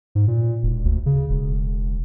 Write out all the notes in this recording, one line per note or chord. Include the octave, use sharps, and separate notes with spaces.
G#2
A#2
E1
D2
C#3
E1